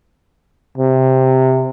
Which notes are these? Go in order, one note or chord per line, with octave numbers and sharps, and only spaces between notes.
C3